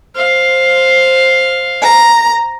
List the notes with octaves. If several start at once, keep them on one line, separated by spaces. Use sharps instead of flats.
C5 F5
A#5